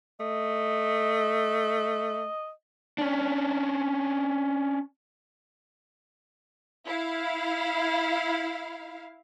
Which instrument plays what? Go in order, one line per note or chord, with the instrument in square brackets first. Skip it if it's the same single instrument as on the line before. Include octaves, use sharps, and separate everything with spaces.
[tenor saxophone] A3 [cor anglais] D#5
[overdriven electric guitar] C#4 D4
[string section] E4 F5